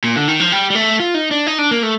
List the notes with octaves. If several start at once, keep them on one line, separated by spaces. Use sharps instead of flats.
A#2
D3
D#3
F3
G3
G3
A3
F4
D#4
D4
D#4
D4
A#3
A3